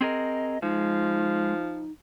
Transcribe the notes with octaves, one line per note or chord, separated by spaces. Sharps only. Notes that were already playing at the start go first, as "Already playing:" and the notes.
C4 G#4 A#4 D#5
F3 G#3 D#4